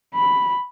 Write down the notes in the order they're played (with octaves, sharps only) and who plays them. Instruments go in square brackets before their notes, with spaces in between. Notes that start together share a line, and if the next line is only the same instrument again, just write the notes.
[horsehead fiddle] B5